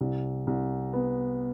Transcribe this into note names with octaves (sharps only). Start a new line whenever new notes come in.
C2
C2
B3